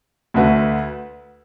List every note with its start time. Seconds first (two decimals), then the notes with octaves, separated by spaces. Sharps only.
0.34 D2 D3 A3 F#4 B4